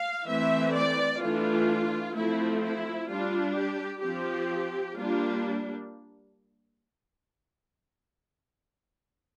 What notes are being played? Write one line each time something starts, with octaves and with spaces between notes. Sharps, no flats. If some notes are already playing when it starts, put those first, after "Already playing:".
Already playing: F5
E3 A3 C4 E5
D5
E3 A3 D4 F4
F3 A3 C4 E4
E4
G3 D4 F4
G4
F3 C4 G4
G3 A#3 D4 F4